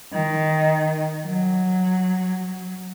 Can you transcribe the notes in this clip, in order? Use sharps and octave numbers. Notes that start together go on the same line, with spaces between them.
D#3
F#3